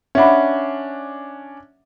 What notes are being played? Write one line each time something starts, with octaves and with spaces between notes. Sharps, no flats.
C#4 D4 E5 F#5 B5